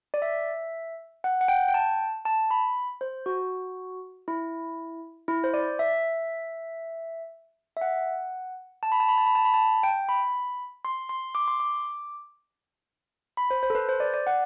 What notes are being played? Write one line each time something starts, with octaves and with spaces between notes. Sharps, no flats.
D5
E5
F#5
F#5
G5
G5
A5
A5
B5
C5
F#4
E4
E4
C5
D5
E5
E5
F#5
A5
B5
A5
B5
A5
B5
A5
B5
A5
G5
B5
C6
C6
D6
C6
D6
B5
C5
C5
A4
B4
C5
D5
D5
F#5